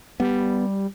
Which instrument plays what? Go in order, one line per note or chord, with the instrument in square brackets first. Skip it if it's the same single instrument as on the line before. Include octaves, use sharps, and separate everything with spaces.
[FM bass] G3 [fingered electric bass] B3